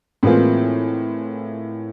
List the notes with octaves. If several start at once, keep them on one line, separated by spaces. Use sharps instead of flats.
A2 E3 G#3 A#3 C4 F4